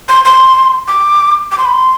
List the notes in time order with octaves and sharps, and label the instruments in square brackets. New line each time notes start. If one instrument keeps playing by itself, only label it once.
[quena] C6
C6
D6
D6
C6
B5
C6